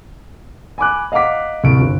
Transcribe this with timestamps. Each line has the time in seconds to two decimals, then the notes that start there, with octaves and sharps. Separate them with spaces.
0.78 G#5 B5 D6 F#6
1.12 D#5 F5 F#5 A#5 D6 B6
1.64 C2 C#6 D7
1.80 G1